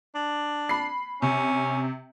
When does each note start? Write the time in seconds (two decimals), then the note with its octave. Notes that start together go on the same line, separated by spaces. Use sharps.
0.15 D4
0.69 B5 C7
1.22 C3 C#4